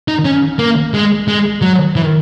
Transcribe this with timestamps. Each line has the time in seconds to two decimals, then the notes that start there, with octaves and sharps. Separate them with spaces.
0.08 D#4
0.25 C#4
0.59 A#3
0.94 G#3
1.28 G#3
1.62 F#3
1.96 E3